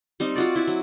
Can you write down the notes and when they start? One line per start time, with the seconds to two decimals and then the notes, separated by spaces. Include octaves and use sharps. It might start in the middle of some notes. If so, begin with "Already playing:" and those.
0.20 G3 C4 D#4
0.36 F4 F#4 D5
0.56 E4 F#4
0.67 F#3